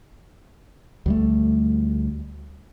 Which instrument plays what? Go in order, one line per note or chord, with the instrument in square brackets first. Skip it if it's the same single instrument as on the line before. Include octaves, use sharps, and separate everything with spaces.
[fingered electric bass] D2 G3 A3